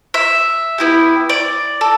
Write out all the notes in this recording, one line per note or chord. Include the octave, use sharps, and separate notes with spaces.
E5
B3 E4 G4
D5
A4